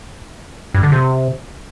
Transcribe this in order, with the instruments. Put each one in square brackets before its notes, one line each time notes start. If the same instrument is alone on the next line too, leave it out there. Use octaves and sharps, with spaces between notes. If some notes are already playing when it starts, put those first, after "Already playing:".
[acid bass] G2
D3
C3